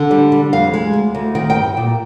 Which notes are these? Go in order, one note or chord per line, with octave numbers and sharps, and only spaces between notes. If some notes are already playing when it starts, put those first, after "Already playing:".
Already playing: D3
G3
G3
F2 F5
G#3
D2
D2
D#3 G5
G5
G2
A#2